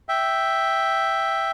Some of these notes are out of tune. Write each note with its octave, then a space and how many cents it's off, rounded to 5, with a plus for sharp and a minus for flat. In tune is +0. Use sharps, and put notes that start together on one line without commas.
E5 +0 G5 +0